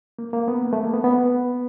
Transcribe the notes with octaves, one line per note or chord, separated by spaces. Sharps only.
A#3
A#3
B3
A#3
A3
A#3
B3
B3